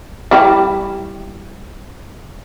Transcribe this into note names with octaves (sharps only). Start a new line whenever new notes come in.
G3 E4 G4